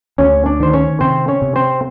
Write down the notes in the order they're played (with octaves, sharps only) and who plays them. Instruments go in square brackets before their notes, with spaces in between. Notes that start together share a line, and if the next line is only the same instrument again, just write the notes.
[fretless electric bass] D2 [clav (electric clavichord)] C#4 C#5
[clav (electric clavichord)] D4 D5
[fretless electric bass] D#3 [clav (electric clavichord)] C5
[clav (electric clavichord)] C#4 C#5
[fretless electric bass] C3 [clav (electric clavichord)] C4 C5
[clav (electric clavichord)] C#4 C#5
[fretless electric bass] C3
[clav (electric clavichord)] C4 C5